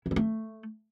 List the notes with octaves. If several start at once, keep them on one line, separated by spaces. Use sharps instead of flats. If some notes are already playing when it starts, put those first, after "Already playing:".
E4
G#3
A3